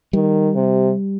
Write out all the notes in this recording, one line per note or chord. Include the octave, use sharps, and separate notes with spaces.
D#3 G3
C3